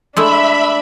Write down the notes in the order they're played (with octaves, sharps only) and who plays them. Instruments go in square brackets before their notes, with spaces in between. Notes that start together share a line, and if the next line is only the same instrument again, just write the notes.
[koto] G#3 A3 E4 [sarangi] D4 [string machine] E5 B5